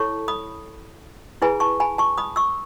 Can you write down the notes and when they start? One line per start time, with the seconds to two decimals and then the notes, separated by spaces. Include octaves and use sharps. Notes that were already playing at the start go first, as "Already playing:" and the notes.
Already playing: E4 A4 C#5 A5 C#6
0.28 B5 D#6
1.42 E4 G#4 B4 G#5 B5
1.60 A5 C#6
1.80 G#5 B5
1.98 A5 C#6
2.18 B5 D#6
2.36 C#6 E6